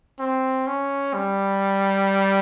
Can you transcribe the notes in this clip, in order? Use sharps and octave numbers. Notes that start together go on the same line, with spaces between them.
C4
C#4
G3